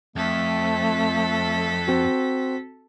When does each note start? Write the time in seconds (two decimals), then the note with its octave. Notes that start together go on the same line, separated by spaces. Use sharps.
0.16 F2 A3 A4 B6
1.88 C4 F#4